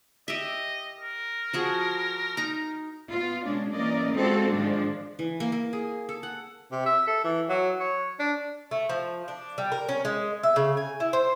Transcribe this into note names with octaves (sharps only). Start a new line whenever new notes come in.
G4 D#5 E5
A#4
F3 F#4 G#4
D#4 A#5
B3 F4
B2 G#3 C#4 D4
E3 A#3 C#4 A#4 D5 D#5
G#3 C4 F4 F#4 A4
G#2 D#3 F3 G#3 D4
E3
A#3
A#3
G#4
A4
F#5
C3
E5
A4
E3
F#3
C#5
D4
A3
F3
D4
G3
A#4
C#4
G#3
E5
C#3
G#5
E4
C5